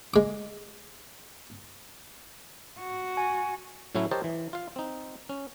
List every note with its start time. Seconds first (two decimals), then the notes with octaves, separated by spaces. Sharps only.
0.14 G#3 D6
2.80 F#4
3.17 G#5
3.95 A2 F#3 A3 C#4 E4
4.11 G4 A#4 C5 C#5 D#5 A5
4.24 E3
4.53 F4 F5
4.76 C4 D#4
5.29 C#4